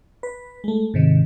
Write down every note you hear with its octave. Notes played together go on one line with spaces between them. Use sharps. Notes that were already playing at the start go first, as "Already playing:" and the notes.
B4
G#3 A3
G#2 C3 D#3